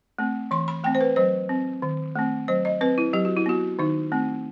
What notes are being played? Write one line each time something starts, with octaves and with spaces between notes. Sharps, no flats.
A3 C4
E3 C6
B5
A3 C4 G5
C5
B4
F#3 C5
C4
D#3
A3 C4
F#3 C5
D#5
C4 B4
E4
F#3 G4
F#4
E4
B3 F#4
D#3 D#4
A3 C4